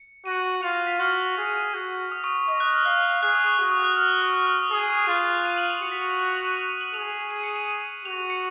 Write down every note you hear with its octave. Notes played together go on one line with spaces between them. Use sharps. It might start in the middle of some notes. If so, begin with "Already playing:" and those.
Already playing: C#7
F#4 D#7
F4 F7
B6
F#4 F6
G#4
F#4
D#6
C#6
C#6
D#5 D#6
F#6
F6
F5 F#6
G#4 F#6
C#6
D#6
C#6
F#4 D#6
D#6
F#6
F6
D#6
C#6
D#6
F6
D#6
G#4
D#6
C#6
D#6
F4 F#6
D#7
F#7
F7
F#4 C#7
B6
C#7
F7
F#7
F7
D#7
F7
D#7
F#7
G#4 F7
D#7
C#7
D#7
C#7
D#7
F#4 F7
F7
C#7